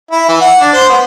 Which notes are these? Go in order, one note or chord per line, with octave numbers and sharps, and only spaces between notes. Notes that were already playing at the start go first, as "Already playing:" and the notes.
E4
E3
F#5
D4
C5
B3